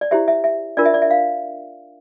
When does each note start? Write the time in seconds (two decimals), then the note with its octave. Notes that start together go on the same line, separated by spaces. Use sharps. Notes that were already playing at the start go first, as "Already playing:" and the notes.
0.01 D5
0.11 E4 G4 C5 E5
0.28 E5
0.44 E5
0.77 D4 F4 A#4 D5
0.85 E5
0.94 D5
1.02 E5
1.11 F5